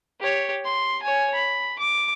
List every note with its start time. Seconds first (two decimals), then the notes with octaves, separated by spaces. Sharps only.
0.20 G4 C#5
0.65 C6
1.03 C#5 G#5
1.35 B5
1.79 D6